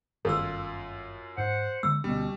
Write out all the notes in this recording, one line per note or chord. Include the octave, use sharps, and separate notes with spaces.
G1 F#2 D#3 F#3 F4 A4 E6
G#2 C5 F#5
D3 G#3 A3 E6
D2 B2 G3 B3 C#4